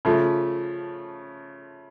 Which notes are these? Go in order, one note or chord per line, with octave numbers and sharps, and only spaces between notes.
C#3 F3 A3